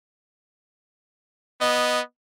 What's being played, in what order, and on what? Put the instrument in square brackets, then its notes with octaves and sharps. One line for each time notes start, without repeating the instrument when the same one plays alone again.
[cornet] B3 [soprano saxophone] D#5